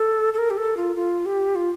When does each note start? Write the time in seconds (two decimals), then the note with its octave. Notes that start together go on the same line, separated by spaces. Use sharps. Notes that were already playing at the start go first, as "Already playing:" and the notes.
Already playing: A4
0.34 A4
0.38 A#4
0.50 G4
0.57 A4
0.77 F4
0.96 F4
1.26 G4
1.55 F4